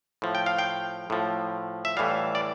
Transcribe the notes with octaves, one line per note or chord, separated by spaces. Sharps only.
A2 F3
G5
F5
G5
A2 F3
E5
A2 E3 G3 F5
D5